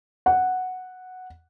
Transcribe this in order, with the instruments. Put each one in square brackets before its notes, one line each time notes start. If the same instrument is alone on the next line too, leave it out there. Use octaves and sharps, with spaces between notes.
[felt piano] F#5